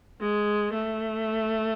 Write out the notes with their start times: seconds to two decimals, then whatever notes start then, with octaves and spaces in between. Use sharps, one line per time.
0.21 G#3
0.73 A3